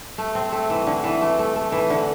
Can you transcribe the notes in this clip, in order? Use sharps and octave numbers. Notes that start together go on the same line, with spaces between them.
A3
C4
A3
E3
D3
E3
A3
A3
A3
E3
D3